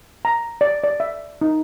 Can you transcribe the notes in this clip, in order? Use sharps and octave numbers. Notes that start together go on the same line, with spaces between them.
A#5
D5
D5
E5
D#4